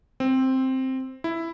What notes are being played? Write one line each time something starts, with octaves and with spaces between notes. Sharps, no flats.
C4
E4